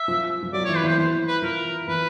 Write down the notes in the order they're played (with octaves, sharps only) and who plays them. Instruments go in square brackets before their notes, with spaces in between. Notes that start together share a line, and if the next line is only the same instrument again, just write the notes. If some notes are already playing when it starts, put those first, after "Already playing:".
Already playing: [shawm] E5
[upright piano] F3
F3
[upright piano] F#3 [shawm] D5
[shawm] C#5
[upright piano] E3
[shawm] B4
[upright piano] E3
[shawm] C5
[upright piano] E3 [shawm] C5
[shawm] B4
[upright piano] F3 [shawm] A#4
[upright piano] E3 [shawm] B4